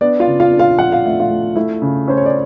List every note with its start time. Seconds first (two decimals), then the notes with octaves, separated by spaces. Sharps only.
0.01 B3 D4 D5
0.20 F4 F5
0.27 C#3
0.40 F4 F5
0.53 D4
0.59 F4 F5
0.78 F3 F#5
0.92 F5
1.05 A3 E5
1.20 F4 F5
1.30 A3
1.56 A3 E4 E5
1.82 C#3
2.08 C#4 C5
2.17 C#5
2.26 D5